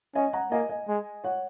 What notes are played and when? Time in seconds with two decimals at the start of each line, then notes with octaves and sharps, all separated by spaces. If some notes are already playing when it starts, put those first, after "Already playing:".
0.15 C#4 D#5 G#5
0.33 F#5 A#5
0.51 A#3 D#5 G#5
0.69 D#5 G#5
0.88 G#3
1.24 C#5 F#5